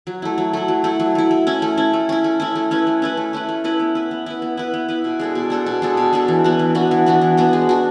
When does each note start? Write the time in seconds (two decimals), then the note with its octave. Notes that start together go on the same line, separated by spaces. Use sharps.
0.07 F#3
0.22 A3 E4
0.38 F#3
0.53 A3 E4
0.68 F#3
0.84 A3 E4
1.00 F#3
1.15 A3 E4
1.31 A3
1.47 C#4 E4
1.62 A3
1.77 C#4 E4
1.93 A3
2.09 C#4 E4
2.24 A3
2.40 C#4 E4
2.55 A3
2.71 C#4 E4 B4
2.87 A3
3.02 C#4 E4 B4
3.17 A3
3.33 C#4 E4 B4
3.49 A3
3.64 C#4 E4 B4
3.80 B3
3.95 E4 B4
4.11 B3
4.26 E4 B4
4.42 B3
4.57 E4 B4
4.74 B3
4.89 E4 B4
5.04 B2
5.19 G#3 D4 A4
5.35 B2
5.50 G#3 D4 A4
5.66 B2
5.82 G#3 D4 A4
5.97 B2
6.13 G#3 D4 A4
6.28 E3
6.44 B3 D4 F#4
6.59 E3
6.75 B3 D4 F#4
6.91 E3
7.06 B3 D4 F#4
7.22 E3
7.37 B3 D4 F#4
7.53 G#3
7.69 D4 F#4